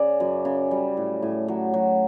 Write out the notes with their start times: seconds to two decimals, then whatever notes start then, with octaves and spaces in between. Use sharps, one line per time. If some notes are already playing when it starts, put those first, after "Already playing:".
Already playing: C#3 D5
0.20 F#2
0.45 C#3
0.71 G3
0.97 A2
1.22 A2
1.48 F#3
1.74 F#3